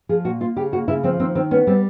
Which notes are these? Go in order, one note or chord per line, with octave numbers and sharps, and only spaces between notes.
F3 G#4
A#2 F#4
A#3 F4
C#3 G4
A#3 F#4
C#3 E4
F3 C4
D#3 C4
D#3 C4
B3 C#4
G3 C4